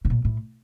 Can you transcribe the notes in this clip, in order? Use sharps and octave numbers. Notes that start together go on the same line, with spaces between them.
C3
A#2
A2